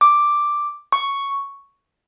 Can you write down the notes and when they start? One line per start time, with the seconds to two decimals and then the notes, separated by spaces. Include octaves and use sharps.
0.01 D6
0.92 C#6